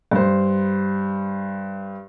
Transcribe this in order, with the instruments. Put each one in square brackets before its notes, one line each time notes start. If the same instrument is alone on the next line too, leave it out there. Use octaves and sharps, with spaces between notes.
[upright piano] G2 C5